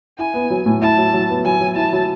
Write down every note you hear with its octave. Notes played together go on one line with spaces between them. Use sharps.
E4 G#5
B3
F#3
A2
E4 A5
F#3
F#3
B3
F#3 G#5
F#3
E4 A5
F#3